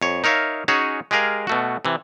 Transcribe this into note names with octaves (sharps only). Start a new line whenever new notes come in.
F2 C#5
D#4 A#4 C#5 E5 F5
C#4 D#4 F#4 G#4 C#5
G#3 G4 G#4 A#4 F5
B2 A3 F#4
C3 E3